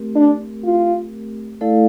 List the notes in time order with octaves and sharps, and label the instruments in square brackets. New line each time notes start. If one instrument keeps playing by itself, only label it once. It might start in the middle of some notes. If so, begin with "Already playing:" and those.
Already playing: [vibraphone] A3 C4 G4 A#4
[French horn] D4
F4
[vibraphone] A3 E4 A4 D5 F5